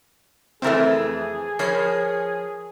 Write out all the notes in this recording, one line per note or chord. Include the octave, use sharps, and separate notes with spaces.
F2 E3 A3 C4 E4 G#4 A#4
F3 A#4 C#5 B5 G6 C7